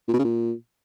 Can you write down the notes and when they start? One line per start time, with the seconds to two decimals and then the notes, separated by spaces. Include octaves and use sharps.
0.08 A#2
0.14 B2
0.19 C#3
0.24 A#2